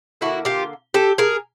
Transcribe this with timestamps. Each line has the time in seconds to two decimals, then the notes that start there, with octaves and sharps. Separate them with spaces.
0.21 D3 F#3 E4 F#4
0.25 A#3
0.45 F4 G4
0.94 G4 A4
1.18 G#4 A#4